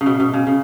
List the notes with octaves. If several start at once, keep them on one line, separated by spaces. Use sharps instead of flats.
C#3
B2
B2
C#3
C#3